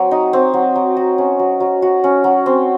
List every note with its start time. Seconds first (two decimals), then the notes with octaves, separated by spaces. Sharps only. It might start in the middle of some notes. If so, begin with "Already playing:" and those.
Already playing: F#3 C4
0.11 D#4
0.33 C4
0.54 F#3
0.76 F#3
0.97 F#4
1.18 C#4
1.39 F#3
1.60 F#3
1.82 F#4
2.04 C#4
2.24 F#3
2.46 C4